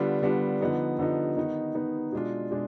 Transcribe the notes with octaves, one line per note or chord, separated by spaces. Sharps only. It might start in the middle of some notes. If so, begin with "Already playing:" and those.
Already playing: D3 G3 B3 D4 F4
D3 G3 B3 D4 F4
D3 F3 B3 D#4
D3 F3 B3 D#4
D#3 B3 D#4
D#3 B3 D#4
B2 G#3 D4 F4
B2 G#3 D4